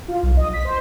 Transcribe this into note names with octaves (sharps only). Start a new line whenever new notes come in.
F4
B1
D#5
B6
C5